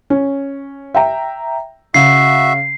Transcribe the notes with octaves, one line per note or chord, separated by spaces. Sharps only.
C#4
E5 G5 A#5
C#3 F#4 E5 C7